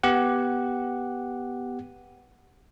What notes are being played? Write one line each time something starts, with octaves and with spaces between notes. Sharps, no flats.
B3 G4 F#5